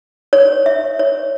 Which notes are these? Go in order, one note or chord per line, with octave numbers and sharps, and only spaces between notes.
C#5
E5
C#5